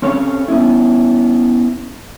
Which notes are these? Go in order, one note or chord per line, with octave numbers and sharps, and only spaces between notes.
C4 C#4 A4 C#5 F5
B3 C#4 E4